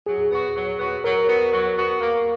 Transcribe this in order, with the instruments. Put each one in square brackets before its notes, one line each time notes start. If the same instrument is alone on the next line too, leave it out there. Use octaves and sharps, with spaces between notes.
[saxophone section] F#3 [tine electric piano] G#4
[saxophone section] B3 F#4
F#3
B3 F#4
[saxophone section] F#3 [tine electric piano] A#4
[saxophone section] B3 F#4
F#3
B3 F#4
A#3